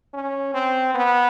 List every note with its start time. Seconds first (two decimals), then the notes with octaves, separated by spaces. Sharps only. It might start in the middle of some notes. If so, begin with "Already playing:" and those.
0.14 C#4
0.54 C4
0.94 B3